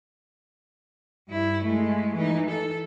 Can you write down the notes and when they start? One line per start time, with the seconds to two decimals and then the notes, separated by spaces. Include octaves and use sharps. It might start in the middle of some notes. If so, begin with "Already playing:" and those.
1.28 G2 E4
1.64 G#3 A3
2.15 E3 D#4
2.50 A4